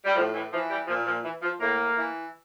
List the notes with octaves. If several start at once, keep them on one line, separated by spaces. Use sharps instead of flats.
G3
A2 F3
E3
E3 F3
G3
A#2 F3
F3
E3
F3
A2 A#3
E3